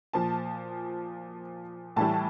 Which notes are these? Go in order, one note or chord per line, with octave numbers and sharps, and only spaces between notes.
A#2 F3 A5
A2 E3 G3 A5